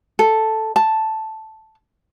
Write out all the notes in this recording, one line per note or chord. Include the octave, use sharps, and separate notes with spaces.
A4
A5